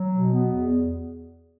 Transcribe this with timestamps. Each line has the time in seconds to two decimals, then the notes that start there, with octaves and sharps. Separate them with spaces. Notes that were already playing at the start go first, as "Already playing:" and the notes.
Already playing: F#3
0.13 B2
0.33 B3
0.52 E2